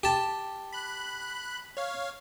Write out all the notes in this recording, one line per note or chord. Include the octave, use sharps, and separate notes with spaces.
G4 A5
B5 F#6
C#5 F5